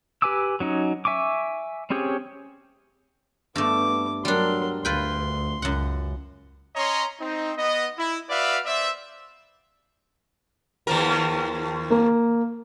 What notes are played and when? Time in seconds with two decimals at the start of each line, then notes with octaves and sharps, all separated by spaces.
0.22 G4 B4 G#5 D6 E6
0.60 F#3 C#4 D#4
1.05 E5 G#5 C#6 D6
1.90 C4 C#4 G4 G#4 C#5
3.56 G2 A3 B3 D6
4.25 F#3 G3 D4 A#4 C6
4.85 D2 F4 B4 G5 C6
5.62 C#2 F#2 F#5
6.75 C#4 C#5 D#5 A#5 C6
7.20 C4 D#4
7.58 B3 D#5
7.98 E4
8.30 F#4 B4 D5 E5 F5
8.65 B3 C5 D5 E5
10.87 D#2 F3 A#4
11.90 A#3